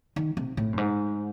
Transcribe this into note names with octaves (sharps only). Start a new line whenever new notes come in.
D#3
C3
A2
F#2
G#2